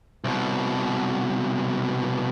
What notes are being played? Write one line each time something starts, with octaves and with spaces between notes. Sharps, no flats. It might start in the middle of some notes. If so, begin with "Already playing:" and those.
C2 B2